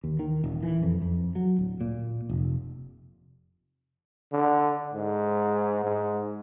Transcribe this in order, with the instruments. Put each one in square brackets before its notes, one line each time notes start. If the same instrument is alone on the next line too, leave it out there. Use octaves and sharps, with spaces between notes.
[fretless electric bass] D#2
D#3
D#1
E3
F2
F2
F#3
D1
A#2
F1
[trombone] D3
G#2
G#2